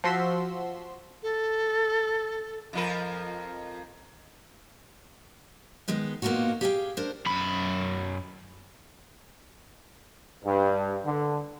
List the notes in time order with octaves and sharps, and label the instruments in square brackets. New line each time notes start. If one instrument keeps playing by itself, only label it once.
[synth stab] F3 F#4 C6 E6 B6
[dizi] A4
[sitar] F2 F3 A#4
[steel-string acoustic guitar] D#3 G#3 B3 D#4
A#2 A#3 B3 D#4 F4 F#4
G4 G#4 D5 E5 F5 G5
D4 A#4 C5
[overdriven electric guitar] F#2 B5
[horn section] G2
D3